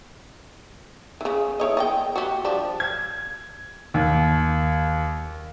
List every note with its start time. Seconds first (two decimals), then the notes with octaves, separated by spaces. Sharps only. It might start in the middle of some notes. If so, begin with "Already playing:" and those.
1.21 C#3 E3
1.60 E4 C#5 D#5
1.77 D#5 F#5 G5
2.16 F#4 G4
2.45 F3 G3 D4
2.80 G#6
3.94 D#2